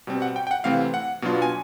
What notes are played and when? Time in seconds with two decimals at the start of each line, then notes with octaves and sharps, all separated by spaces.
0.07 B2 G3 C4
0.22 F#5
0.36 G5
0.47 G5
0.51 F#5
0.64 C3 E3 A3 C4 F5
0.94 F#5
1.22 B2 F#3 B3 D4 F4
1.42 G#5